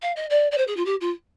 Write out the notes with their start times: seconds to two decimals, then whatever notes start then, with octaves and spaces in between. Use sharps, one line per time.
0.02 F5
0.16 D#5
0.30 D5
0.51 D5
0.57 C5
0.67 G#4
0.76 F4
0.86 G4
1.01 F4